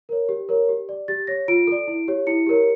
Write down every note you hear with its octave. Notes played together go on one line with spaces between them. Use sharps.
A#4 C#5
G4
A#4 C#5
G4
D5
G4 A6
C#5 A#6
F4 D7
A4 D5
E4
G4 C#5
E4 C#7
G4 A#4 C#5